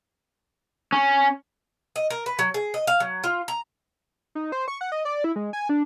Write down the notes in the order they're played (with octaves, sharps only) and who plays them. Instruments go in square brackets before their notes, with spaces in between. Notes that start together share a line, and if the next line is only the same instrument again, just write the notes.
[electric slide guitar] C#4
[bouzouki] D#5
A#4
B4
F#3
G#4
D#5
F5
F#3
F4
A#5
[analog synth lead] D#4
C5
C#6
F#5
D#5
D5
E4
G#3
G#5
D4